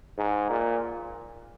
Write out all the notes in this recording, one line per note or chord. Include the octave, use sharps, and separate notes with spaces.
G#2
A#2